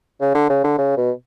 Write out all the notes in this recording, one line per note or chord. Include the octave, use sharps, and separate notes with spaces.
C#3
D3
C#3
D3
C#3
B2